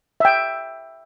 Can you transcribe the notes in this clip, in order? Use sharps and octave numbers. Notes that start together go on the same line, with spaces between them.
E5 G5